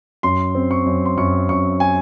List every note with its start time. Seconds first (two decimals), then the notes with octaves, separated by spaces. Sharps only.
0.23 F#2 C6
0.55 C4
0.71 C#6
0.86 F#2
1.06 C6
1.17 F#2 C#6
1.49 F#2 C#6
1.80 G#5